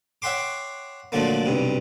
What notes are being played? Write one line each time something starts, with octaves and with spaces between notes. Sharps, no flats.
C#5 E5 F#5 G5 C6 D6
A#2 D3 F3 F#3 A3 A#3
B1 G2 C3